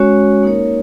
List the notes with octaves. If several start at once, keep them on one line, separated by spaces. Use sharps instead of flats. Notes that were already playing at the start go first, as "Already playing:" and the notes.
Already playing: G#3 C#4 F#4 C#5
A#3 D#4 A#4 C#5